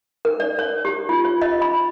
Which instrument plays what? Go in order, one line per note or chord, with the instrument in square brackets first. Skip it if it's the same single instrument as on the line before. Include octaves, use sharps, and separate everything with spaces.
[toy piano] A#4
D5
C#5
G4
F4
C#5
D#5
B5